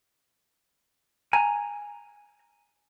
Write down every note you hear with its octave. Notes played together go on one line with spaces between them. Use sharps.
G#5 A#5